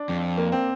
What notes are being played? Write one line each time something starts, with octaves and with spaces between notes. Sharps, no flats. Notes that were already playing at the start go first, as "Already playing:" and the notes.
Already playing: D4
F2
A#3
C4